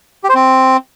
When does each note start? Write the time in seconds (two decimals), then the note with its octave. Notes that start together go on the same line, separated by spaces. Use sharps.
0.24 G4
0.29 C5
0.35 C4